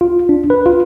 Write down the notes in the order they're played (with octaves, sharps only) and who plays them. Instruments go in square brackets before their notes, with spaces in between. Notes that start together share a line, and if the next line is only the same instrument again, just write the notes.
[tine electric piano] F4
D4
B4
F4